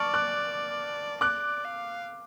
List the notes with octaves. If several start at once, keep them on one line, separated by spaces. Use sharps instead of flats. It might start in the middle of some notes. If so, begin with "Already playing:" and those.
Already playing: D5 A5 C#6 D6 F6
D6 F#6
D5 D6 F#6
F5